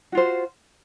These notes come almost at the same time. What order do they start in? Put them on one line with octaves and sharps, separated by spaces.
F#4 F4 C5